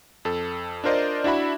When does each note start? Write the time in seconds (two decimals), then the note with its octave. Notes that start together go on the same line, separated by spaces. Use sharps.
0.25 F2 A4
0.84 D4 F4 A#4 C5 D5 D#5
1.24 D4 E4 F#4 E5 B5